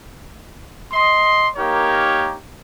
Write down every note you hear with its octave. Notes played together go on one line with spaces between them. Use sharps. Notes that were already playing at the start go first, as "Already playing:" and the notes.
D#5 C6
A#3 D#4 G4 A#4 C#5